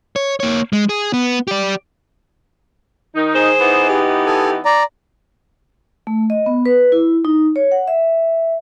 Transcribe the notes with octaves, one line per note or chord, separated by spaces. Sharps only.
C#5
A#3 C#5
G#3
G#4
B3
G4 D5
D#3 D#4
G#4 C5
E3 B3 D#4
G4
A4 G#5
D5 A#5
A3
D#5
B3
B4
E4
D#4
C#5
F#5
E5